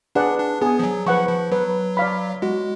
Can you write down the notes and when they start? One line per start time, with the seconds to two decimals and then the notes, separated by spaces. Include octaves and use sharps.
0.15 D4 G#4 B4 D5 F#5
0.39 D4
0.61 B3 G#4
0.79 F3
0.83 F#3
1.06 F3 B4 F#5 C#6
1.29 F3
1.52 F#3 B4
1.97 D5 F5 B5
2.42 G#3 F#4